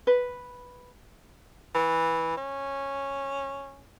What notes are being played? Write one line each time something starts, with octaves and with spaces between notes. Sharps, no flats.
B4
E3
C#4